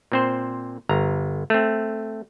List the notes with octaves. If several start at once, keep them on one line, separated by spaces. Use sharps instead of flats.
A#2 C4 C5
G1 A#5
A3 C4